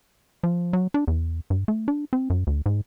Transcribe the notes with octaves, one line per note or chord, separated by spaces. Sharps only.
F3
F#3
D4
E2
G2
A3
D4
C4
F#2
D2
G#2